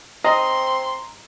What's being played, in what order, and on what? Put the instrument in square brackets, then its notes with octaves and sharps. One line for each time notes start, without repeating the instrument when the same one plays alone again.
[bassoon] C4 [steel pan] D#5 [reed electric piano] A#5 [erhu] C6